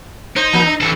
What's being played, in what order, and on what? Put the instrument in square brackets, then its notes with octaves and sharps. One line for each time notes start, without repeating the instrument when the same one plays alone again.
[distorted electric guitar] D#4 [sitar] C5
[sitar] E3 A#3
D4
[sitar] G2 [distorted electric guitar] E3 A4